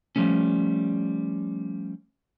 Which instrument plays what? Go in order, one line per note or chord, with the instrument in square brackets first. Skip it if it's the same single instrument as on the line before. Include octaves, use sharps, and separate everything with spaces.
[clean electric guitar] F3 G3 A3 C#4